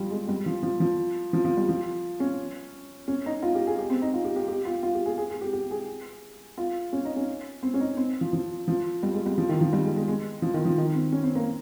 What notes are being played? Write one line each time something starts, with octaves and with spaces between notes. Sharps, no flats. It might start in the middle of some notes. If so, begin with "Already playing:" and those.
Already playing: F3 G3
G#3
G3
F3
F3
F3
F3
F3
G3
F3
C#4
C#4
D#4
F4
G4
G#4
G4
C4
D#4
F4
G4
G4
G4
F4
F4
G4
G#4
G#4
G#4
G4
G4
G#4
F4
C#4
D#4
C#4
C4
C#4
D#4
C4
F3
F3
F3
G3
G#3
G3
F3
D#3
F3
G3
G#3
G#3
G#3
F3
D#3
F3
D#3
C4
C#4
C4
A#3